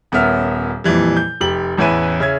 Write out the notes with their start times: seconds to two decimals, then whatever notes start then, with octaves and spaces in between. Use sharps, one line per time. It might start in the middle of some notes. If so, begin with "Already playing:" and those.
0.12 D#1 B3 C#4 A#4 E5 F6
0.84 F2 A#2 E3 G3
1.17 G6
1.41 F1 G4 F#7
1.78 A1 E2 C#4 E4 B4 D#7
2.20 C#3 C#4 E5 G#6